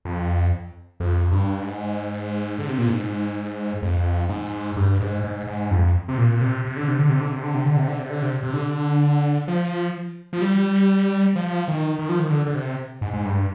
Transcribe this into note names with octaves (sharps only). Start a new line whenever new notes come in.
F2
F2
G2
G#2
D3
C3
A#2
G#2
F2
G#2
G2
G#2
G#2
G#2
F2
C3
A#2
C3
C3
D3
C3
D3
C3
D3
C3
D3
C3
D3
C3
D3
C3
D3
C3
C3
D3
F3
F3
G3
F3
D#3
D#3
F3
D#3
D3
D3
C3
G#2
G#2
G2